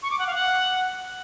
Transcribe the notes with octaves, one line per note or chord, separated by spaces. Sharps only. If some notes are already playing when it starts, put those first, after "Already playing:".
C#6
D6
F#5
F5
F#5